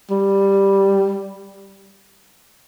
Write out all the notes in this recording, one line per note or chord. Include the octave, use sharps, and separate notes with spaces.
G3